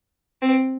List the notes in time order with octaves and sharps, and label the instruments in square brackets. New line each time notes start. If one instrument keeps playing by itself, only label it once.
[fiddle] C4